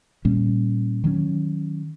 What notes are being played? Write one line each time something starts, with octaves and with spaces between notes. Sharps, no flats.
A#2 G3 A#3 C#4
D#3 F#3 A3 C#4